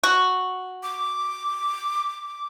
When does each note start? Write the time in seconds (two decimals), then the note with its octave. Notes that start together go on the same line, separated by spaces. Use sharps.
0.03 F#4
0.83 D6